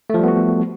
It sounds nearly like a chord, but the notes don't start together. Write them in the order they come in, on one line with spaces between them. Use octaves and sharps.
A3 F3 G3 B3 F#4